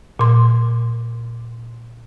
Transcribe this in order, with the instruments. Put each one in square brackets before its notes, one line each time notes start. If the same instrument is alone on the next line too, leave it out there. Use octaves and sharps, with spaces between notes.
[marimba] A#2 C6